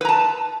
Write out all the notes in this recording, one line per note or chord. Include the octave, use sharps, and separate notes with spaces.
B4 A5 A#5